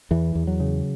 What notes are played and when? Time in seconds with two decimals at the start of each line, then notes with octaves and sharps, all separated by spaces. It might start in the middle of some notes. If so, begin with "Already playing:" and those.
0.11 E2 E3
0.35 E2
0.47 F#3
0.60 C#3